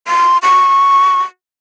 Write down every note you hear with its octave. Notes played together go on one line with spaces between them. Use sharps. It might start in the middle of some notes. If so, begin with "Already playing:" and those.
C6
C#6